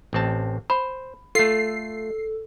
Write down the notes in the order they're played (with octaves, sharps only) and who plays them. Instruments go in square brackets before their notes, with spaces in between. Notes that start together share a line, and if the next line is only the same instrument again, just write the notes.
[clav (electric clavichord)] A1 C4 A5
[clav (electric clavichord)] C5 [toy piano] B5
[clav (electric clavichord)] A3 F4 [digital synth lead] A4 [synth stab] C7